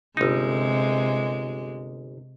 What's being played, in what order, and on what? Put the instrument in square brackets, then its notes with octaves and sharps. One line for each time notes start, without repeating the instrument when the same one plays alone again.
[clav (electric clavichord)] G1 D#4 [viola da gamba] C3 G#3